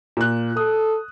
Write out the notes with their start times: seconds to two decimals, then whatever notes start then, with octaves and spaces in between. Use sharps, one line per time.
0.17 A#2 F#6
0.57 A4 D#6